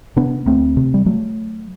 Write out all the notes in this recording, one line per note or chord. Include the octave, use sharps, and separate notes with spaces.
C3 B3 D4
D2 A3 C4
C3
G3
F#3 A3